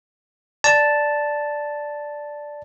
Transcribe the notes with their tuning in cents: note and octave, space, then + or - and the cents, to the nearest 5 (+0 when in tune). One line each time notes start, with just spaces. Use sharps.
D5 +0 A5 +0